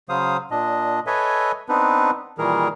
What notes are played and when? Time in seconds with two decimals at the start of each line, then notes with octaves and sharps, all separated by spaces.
0.09 C#3 F#3 C5 F5 D#6
0.51 A#2 D4 D#5
1.07 A4 B4 C#5 D#5 E5 G#5
1.69 B3 C4 D4 D#4 B4
2.38 A#2 D#3 E3 G3 G#4 A#4